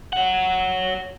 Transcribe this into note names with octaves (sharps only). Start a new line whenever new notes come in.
C#5 F#5